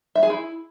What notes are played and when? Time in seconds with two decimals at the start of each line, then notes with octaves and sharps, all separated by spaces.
0.15 E5
0.23 G#4
0.30 E4